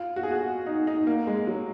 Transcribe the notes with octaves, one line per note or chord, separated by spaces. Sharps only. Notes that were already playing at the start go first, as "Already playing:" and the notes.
Already playing: F4
F#4
G#4
F#4
D#4
D#4
A#3
G#3
F#3